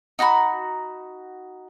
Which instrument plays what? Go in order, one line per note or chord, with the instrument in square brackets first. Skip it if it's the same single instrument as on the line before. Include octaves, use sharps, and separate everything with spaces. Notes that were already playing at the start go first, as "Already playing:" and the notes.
[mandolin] D#4 F#4 A#5 B5